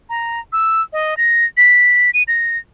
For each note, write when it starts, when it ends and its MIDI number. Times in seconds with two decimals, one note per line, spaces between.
0.10 0.40 82
0.53 0.82 88
0.93 1.14 75
1.17 1.45 94
1.57 2.11 95
2.14 2.23 99
2.28 2.57 94